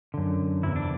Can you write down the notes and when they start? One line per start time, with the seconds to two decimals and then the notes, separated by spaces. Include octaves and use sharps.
0.14 F#2 D3
0.63 E2 C3 E3 E4
0.76 D4